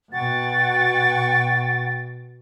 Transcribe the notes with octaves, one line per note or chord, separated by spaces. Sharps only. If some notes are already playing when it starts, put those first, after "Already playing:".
B2 F#5 G5 C#6 A6